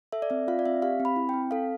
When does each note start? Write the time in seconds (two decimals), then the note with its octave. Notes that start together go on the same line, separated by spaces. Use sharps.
0.12 A4 E5
0.22 D5
0.30 C4 E5
0.48 F4 F5
0.59 D5
0.65 C4 E5
0.82 G4 F5
1.00 C4
1.05 B5
1.16 E4
1.29 C4 G5
1.51 A4 F5